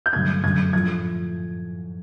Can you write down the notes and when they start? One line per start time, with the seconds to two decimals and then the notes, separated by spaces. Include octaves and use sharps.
0.06 G6
0.13 G2 D3 F#3 A3 G#6
0.43 F#2 D3 F#3 G#6
0.73 A2 F3 A3 G#6